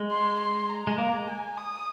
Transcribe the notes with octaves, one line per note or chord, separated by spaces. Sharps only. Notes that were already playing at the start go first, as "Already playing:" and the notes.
Already playing: G#3
C6
C6
A#5
G#3
A#3
G#3
G#5
D#6